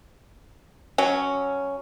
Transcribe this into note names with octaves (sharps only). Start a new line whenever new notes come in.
F#3 C#4